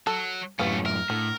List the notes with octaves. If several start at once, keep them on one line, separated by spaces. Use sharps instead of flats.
F#3 A4
F#2 A2 G3 A3 B3 C#4 F5
A#4 E5
A2 D3